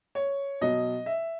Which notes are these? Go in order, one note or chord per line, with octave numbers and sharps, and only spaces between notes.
C#5
B2 F#3 D#5
E5